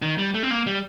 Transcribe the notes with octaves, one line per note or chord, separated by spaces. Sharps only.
D#3
G3
A3
C4
A#3
G3